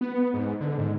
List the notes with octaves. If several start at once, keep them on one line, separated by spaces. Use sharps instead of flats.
B3
G#2
D3
G#2